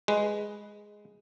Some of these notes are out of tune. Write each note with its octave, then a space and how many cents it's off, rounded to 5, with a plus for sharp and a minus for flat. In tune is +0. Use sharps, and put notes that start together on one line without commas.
G#3 +0 B4 +0